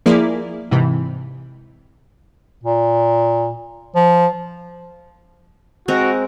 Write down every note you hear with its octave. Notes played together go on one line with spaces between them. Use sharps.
F3 A#3 E4 G#4 A#4 D5
G#2 C3 E3
A#2
F3
G#3 C4 F#4 A#4